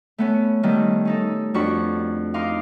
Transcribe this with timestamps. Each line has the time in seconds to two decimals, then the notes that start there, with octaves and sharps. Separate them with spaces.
0.18 A3 B3 C#4
0.63 D#3 G3 A3 B3
1.05 C#4 D#4 A4
1.54 F2 D4 F#4 B4 C#6
2.34 D#4 F5 C6 D6